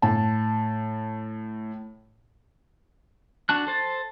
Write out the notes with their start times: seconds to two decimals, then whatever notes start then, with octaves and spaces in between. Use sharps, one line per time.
0.02 A2 A5
3.49 D4 F#4 A5 F#6
3.67 A4 C5 A5